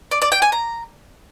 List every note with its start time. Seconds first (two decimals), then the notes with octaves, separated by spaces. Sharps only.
0.11 D5
0.22 D5
0.32 G5
0.42 G#5
0.52 A#5